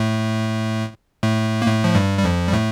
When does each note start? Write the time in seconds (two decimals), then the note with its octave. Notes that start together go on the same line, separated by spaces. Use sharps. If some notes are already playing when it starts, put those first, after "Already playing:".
Already playing: A2 A3
1.23 A2 A3
1.62 A#3
1.66 A2 A3
1.84 F3
1.95 G2 G3
2.19 G3
2.24 F2 F3
2.48 G3
2.53 A2 A3